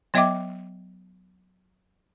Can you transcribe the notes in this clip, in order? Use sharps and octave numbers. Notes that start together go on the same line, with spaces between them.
F#3 B3 D#5 E5 G5 D6